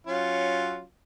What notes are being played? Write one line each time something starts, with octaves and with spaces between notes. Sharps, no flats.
F#3 C#4 F4